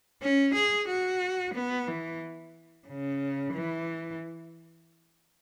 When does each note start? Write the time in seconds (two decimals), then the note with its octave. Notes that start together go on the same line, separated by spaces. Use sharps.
0.22 C#4
0.55 G#4
0.89 F#4
1.55 B3
1.88 E3
2.87 C#3
3.54 E3